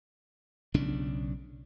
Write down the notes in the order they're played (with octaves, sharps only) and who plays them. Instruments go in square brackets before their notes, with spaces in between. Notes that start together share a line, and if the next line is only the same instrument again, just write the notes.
[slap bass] B1 C#3 D4